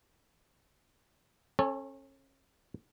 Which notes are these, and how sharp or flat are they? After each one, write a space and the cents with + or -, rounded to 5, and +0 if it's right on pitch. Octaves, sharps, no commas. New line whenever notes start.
C#4 -35 A4 +0 C#5 +0